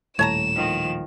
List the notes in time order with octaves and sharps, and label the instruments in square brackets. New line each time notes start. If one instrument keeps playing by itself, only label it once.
[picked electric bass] D#1 A2 [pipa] C#5 A5 A#5 [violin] E7
[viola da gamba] D#3 F3